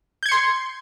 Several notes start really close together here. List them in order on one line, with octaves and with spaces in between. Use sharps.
G6 G#6 C#7 C6